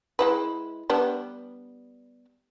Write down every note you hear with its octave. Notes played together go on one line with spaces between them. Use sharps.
G#3 E4 B4
G3 B3 D4